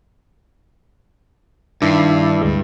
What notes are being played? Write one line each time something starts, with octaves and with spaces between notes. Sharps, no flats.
G2 D#3 D4 E4 C7
D2 G#3